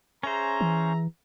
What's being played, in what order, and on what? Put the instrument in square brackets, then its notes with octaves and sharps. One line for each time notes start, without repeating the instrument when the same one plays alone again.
[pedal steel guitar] C#4 C5 [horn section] G#4 E5 A#5
[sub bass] E3